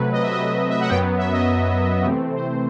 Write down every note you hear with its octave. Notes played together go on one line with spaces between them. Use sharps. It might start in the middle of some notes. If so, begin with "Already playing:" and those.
Already playing: C3 F#3 A3 B4
D#5
E5
D#5
E5
F#5
F#2 F#3 B3 G5
E5
D#5
F#4
C3 E3 A3 C4 G4
C5